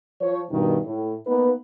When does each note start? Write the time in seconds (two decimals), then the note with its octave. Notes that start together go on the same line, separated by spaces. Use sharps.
0.21 F3 C5 C#5
0.51 G2 B2 D#3
0.85 A2
1.27 A#3 B3 D#4 B4